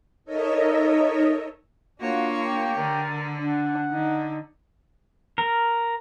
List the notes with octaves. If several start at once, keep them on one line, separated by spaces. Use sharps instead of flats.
D#4 A4 A#4 C#5 D#5 E5
A#3 D4 F4 F#4 C#5
G4
D3 A#4
D4 F#5
D3 D#4
A#4